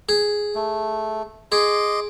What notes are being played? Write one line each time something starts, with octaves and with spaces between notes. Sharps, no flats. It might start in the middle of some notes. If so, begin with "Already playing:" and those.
G#4
A3
G#4 D#5 C6 D6